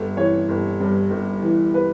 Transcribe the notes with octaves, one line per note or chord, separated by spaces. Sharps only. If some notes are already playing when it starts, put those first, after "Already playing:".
Already playing: G1 A4
E3 C#5
G1
G2
G1
E3
B4